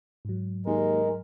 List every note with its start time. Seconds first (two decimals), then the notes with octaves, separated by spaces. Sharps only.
0.25 G#2 F#3
0.66 D#2 G#3 A#4